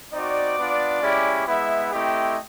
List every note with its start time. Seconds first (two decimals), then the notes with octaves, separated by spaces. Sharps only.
0.13 C4 D#4 F#4 D5
0.57 B3 D4 F4
1.02 G#3 C#4 E4 G4
1.47 G#3 B3 E4 E5
1.92 A3 C4 E4 G4 D#5